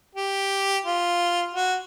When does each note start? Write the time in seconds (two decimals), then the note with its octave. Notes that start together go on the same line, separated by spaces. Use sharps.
0.16 G4
0.86 F4
1.55 F#4